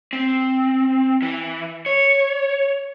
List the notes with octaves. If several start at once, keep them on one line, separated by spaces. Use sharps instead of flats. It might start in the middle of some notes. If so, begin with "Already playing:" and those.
C4
E3
C#5